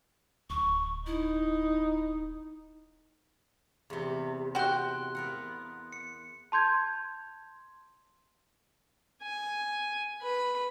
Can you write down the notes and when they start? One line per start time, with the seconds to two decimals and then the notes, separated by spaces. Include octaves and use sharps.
0.50 D1 C#6
1.06 D#4 E4
3.90 E2 C3
4.55 F#4 G5 C6 F#6
5.15 B3 A#4 F#5
5.92 C#7
6.52 A5 C6 G6 G#6
9.22 G#5
10.21 B4 B5